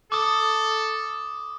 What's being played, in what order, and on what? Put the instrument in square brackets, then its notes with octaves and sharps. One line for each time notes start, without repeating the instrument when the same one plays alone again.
[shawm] A4 [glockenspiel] D6 D#6